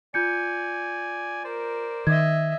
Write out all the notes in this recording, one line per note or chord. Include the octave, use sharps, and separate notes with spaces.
F4 D5 G#5 G6 C#7
A#4 C5 D5
D#3 D#5 E5 G#6